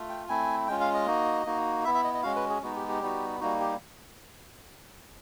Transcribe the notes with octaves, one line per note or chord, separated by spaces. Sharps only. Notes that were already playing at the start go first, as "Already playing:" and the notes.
Already playing: A3 F4
G5
A3 C4 E4 G#5
G#3 C#4 F4 G5
F5
D#5
A#3 D#4 F#4
A#3 D#4 F#4
B3 E4 E5
E5
D#5
D#5
G#3 C#4 F#4 F5
B4
G#4
G#3 B3 D#4 F#4
G4
G4
G3 B3 D#4 F#4
G3 A#3 D#4 F#4
G4